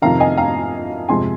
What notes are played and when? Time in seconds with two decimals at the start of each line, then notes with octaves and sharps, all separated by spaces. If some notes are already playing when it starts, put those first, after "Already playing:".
0.02 F2 C3 D#3 F5 A#5
0.20 D#5 G#5
0.37 F5 A#5
1.09 F2 C3 G#3 G#5 C6